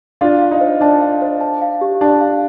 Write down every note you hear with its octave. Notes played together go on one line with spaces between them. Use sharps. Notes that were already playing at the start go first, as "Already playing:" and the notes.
D4 F4 F5
F5
D#4
C5
D4 A5
F5
C5
A5
F5
G4
D4 A5
F5